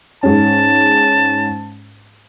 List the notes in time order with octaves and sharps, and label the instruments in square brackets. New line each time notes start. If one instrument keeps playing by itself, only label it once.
[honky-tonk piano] G#2 G#3 C#4 [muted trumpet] A5